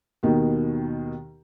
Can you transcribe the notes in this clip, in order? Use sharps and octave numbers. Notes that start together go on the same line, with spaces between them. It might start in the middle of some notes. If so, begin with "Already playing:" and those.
D#2 B2 D#3